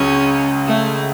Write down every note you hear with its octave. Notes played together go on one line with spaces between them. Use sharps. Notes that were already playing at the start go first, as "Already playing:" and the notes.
Already playing: C#2 C#3 F#3 C#4
A3